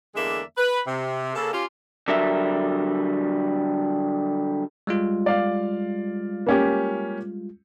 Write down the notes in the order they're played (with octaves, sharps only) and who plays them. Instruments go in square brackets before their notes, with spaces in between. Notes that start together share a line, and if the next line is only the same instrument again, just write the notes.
[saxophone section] E2 D3 G#3 A#3 D5 E5
B4
C3
C#3 A#3 A4
C#4 F4 G4
[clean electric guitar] D3 F#3 G3 A#4 E5
[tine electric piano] G3 G#3 F4
[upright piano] D5 F5
A#3 C#4 G4